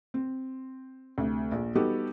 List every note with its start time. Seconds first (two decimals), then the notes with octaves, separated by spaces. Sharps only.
0.14 C4
1.18 D2 C3
1.52 A#1
1.75 G3 B3 D#4 F#4 G4 A4